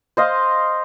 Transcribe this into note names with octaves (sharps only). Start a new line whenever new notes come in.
C5 D#5 F5